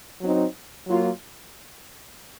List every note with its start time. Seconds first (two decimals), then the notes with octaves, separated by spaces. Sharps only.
0.21 F#3 C4 D#4
0.87 F#3 A#3 F4